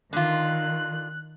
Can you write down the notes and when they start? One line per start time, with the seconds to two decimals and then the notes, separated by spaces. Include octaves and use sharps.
0.13 D3 D#3 F4 F#6